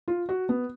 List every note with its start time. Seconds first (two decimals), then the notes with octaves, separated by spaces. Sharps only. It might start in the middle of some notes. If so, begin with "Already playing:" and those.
0.08 F4
0.29 F#4
0.49 B3